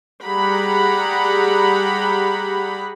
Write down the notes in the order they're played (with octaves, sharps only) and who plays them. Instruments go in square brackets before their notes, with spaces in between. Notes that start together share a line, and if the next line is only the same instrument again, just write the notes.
[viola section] G3 G4 G#4 F#5 A#5 B5